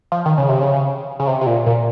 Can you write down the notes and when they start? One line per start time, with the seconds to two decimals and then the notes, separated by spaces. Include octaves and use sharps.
0.12 F3
0.26 D#3
0.38 C#3
0.49 C3
0.61 C#3
1.20 C#3
1.27 C3
1.41 C3
1.47 A#2
1.66 A#2